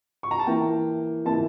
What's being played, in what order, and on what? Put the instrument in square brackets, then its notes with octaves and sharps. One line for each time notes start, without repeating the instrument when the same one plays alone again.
[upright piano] C#6
A#5
A5
E3 A#3 E4 G5
E3 A#3 E4 A5